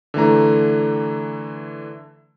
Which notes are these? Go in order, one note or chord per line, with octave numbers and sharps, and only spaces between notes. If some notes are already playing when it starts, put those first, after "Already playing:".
D3 E3 A3 A#5